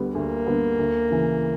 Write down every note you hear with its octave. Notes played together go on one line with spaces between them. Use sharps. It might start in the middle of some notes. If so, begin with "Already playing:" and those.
Already playing: D2 D3 G3 B3
D2 A#3
D3 G3 B3
D2
C#3 E3